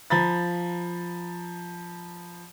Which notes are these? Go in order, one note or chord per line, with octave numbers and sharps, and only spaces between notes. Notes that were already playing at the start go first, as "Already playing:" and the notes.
F3 A#5 B5 A6